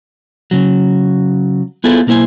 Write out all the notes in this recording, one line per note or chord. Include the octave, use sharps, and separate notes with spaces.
C#3 F#3
B3 E4 F4 G#4 A4 C5
B1 A#3 E4 C5 G#5